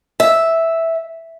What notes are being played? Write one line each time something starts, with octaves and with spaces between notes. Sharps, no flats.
E5